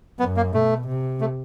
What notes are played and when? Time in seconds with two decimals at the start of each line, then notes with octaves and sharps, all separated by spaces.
0.19 F#2 B3
0.37 A#3
0.54 B2 A3
0.87 C3
1.21 A3